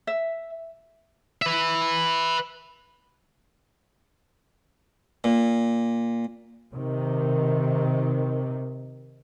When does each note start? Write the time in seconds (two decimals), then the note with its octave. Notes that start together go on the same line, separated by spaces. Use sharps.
0.07 E5
1.42 B4 E5
5.24 A#2
6.74 C3 D#3